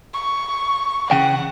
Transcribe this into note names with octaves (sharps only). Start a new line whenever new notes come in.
C#6
C#3 E3 F#5 G5